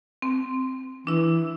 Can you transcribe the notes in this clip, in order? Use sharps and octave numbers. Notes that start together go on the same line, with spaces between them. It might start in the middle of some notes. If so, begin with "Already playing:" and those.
C4
E3 D4 E4